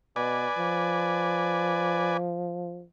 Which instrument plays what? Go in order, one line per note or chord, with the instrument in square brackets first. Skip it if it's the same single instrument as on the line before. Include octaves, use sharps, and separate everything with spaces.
[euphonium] B2 [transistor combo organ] B4 D5 G#5
[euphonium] F3